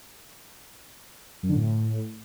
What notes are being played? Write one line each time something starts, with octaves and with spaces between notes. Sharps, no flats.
F#2
D3
A2